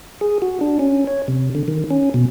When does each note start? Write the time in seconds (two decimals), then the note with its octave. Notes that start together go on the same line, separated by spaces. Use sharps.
0.21 G#4
0.42 F#4
0.61 D4
0.79 C#4
1.07 C#5
1.28 C3
1.55 D3
1.68 D#3
1.90 C#4
2.14 B2